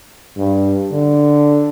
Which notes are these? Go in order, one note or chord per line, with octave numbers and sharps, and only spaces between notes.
G2
D3